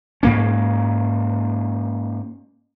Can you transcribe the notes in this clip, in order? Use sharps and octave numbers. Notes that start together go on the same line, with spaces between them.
G#2 A#3 C#4